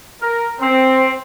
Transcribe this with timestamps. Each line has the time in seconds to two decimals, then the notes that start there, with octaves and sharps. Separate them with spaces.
0.22 A#4
0.60 C4